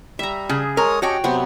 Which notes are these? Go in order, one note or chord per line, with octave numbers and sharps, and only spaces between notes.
G3 E5 A#5
C#3 G#4
G#3 A#4 C#5 D#6
C#4 F#4 G4 C#5 D#5 G5
C3 F#3 B3 C5